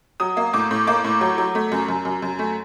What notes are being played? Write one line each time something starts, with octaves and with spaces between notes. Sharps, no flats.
F#3 D#6
A#3
A2 D6
A2
A#3 D6
A2
F#3
F#3
A3
F#2
F#2
F#2
F#2
A3